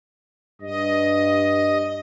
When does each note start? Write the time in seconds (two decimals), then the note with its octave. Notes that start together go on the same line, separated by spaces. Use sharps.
0.61 G2 D#5